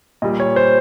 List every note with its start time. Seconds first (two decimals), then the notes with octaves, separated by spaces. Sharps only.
0.22 A#2 G3 D#5
0.40 C#5
0.56 C5